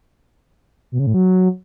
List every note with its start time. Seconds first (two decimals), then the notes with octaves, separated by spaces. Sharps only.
0.92 B2
0.99 C#3
1.07 A2
1.14 F#3